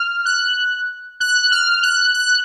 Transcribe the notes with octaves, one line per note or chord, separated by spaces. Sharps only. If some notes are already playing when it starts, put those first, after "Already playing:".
Already playing: F6
F#6
F#6
F6
F#6
F#6